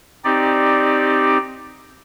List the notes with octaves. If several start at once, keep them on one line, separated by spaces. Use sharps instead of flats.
C4 D#4 G4 D5